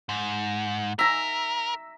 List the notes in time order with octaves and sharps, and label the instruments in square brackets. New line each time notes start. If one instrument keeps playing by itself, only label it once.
[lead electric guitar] G#2
[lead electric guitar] A#4 [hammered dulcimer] E5 A#5